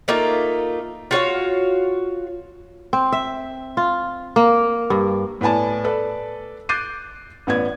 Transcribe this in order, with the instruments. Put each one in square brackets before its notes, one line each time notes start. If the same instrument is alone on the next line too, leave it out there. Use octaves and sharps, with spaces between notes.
[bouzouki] A3 A#3 D#4 F4
F4 F#4 C#5 F5
[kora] C4
E5
F4
A#3
G2
[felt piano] A2 B3 D5 G#5 A5
A4 B4 D5
D6 F#6 G6 A6 C7 D#7
A1 B3 D5 G#6